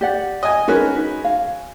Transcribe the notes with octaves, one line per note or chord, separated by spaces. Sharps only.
G4 D5 F#5
D#5 G#5
G#3 C#4 D#4 F#4 A#4 B4
D#4 B4
F5